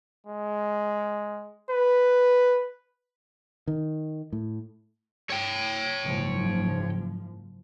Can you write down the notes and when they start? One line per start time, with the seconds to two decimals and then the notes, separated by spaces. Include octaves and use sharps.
0.27 G#3
1.71 B4
3.68 D#3
4.33 A2
5.30 C#5 G5
6.04 F#1 G#2 F3